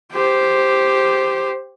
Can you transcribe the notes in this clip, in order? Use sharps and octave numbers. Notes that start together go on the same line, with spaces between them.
G4 C5